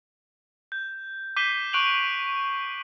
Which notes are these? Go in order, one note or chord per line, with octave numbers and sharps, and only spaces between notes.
G6
D6 G6 B6 C7 D#7 G7
C#6 F#6 D7 D#7 F7 F#7